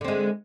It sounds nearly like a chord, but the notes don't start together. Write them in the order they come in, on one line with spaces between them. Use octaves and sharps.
D3 C4 G#3